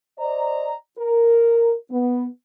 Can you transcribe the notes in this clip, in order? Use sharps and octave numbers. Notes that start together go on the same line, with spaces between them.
C5 D5 D#5 A#5
A#4
B3